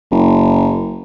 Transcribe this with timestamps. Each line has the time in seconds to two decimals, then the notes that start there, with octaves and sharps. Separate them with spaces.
0.11 F#1